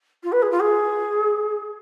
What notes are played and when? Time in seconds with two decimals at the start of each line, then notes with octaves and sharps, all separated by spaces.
0.24 F4
0.32 B4
0.42 G#4
0.51 F4
0.60 G#4